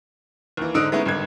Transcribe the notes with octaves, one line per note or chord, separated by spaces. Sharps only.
D#2 E3
G#2 D3 D#4 D#6 E6 D7
G#3 A3 B3 C#4 D#4 E4
G#1 G2 D3 G#6